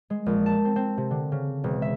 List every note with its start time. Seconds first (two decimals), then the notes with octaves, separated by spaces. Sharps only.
0.10 G#3
0.26 A#1
0.46 A5
0.65 C4
0.76 C4
0.97 C3
1.11 D3
1.32 C#3
1.64 E1
1.82 E5